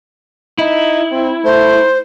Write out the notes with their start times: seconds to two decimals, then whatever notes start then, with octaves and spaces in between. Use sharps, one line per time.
0.58 D#4 E4
1.11 C4
1.44 A3 C5